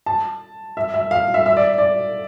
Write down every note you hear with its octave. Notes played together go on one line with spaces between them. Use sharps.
A5
E5
E5
F5
E5
E5
D5
D5